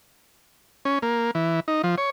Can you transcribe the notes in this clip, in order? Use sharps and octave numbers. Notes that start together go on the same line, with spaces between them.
C#4
A#3
E3
D#4
F3
C#5